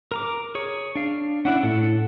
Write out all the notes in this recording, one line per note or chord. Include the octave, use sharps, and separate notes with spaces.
A#4 A#5 D6
G#4 C#5
D4 F5
C#4 D4 E4 F#5
A2 A4 F#5